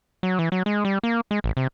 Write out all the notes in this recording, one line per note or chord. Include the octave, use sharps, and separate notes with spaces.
F#3
E3
F#3
G#3
G3
A#3
G#3
A1
C3